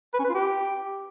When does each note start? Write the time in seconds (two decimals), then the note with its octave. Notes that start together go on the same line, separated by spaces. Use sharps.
0.14 B4
0.19 C#4
0.24 B4
0.29 F4
0.35 G4